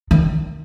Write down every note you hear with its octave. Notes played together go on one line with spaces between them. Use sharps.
D#3